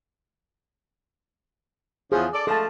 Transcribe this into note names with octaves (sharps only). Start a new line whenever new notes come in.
E2 C#3 F3 G#4
A4 D5
F3 G#3 A3 A4 A5